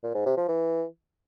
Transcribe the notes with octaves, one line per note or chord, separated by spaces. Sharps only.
A#2
G#2
C3
F3
E3